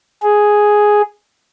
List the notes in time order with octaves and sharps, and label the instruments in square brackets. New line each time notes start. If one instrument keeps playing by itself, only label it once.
[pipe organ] G#4